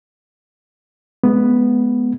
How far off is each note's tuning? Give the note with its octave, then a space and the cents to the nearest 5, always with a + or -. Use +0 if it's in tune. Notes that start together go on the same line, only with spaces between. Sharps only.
G#3 +30 B3 +0